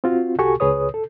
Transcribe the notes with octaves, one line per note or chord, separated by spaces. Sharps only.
C4 F4 F#4
C2 F#4 G4 A4 G#5 C#6
C#2 G#4 B4 C#5 D#6
A4